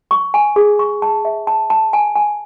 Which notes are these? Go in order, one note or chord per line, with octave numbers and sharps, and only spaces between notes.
C#6
G#5
G#4
C#6
A5
E5
A5
A5
G#5
G#5